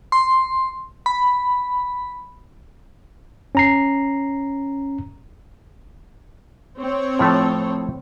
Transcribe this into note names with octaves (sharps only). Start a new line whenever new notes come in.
C6
B5
C#4 A#5 C7
C4 C#5
A2 F3 A3